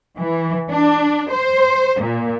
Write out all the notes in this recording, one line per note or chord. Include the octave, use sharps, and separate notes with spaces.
E3
D4
C5
A#2